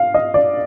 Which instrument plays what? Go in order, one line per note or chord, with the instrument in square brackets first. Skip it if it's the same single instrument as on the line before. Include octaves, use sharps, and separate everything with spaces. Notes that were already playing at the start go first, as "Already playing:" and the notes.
Already playing: [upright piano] F5
D#5
D5